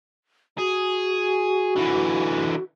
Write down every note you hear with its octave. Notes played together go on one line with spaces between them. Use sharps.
F#4 G#4
D3 E3